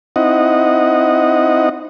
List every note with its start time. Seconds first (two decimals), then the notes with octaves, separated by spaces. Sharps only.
0.16 C4 D#4 E4 D#5 F#5